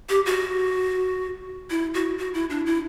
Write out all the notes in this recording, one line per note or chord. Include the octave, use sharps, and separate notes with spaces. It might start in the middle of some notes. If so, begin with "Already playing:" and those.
G4
F#4
E4
F#4
F#4
E4
D4
E4